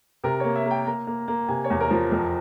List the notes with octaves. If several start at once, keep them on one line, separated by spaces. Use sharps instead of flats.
C3 A#4
A#3 C#5
E5
A#3
G5
A#3 A#5
A#3
A#3
C3 G#5
C#5
E2
A#4
F3 A#4
F2 A#4